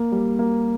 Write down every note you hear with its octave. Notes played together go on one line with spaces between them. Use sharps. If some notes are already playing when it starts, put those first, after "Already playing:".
Already playing: A#3
G3
A#3